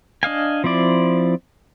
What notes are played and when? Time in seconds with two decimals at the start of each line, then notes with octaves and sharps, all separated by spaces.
0.23 D4 D#5 F5 G#5
0.64 F3 C4 E4 D5